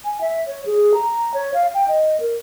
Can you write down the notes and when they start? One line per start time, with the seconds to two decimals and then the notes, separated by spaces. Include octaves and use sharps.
0.05 G#5
0.21 E5
0.47 C#5
0.66 G#4
0.94 A#5
1.34 C#5
1.54 F5
1.74 G5
1.88 D#5
2.20 A#4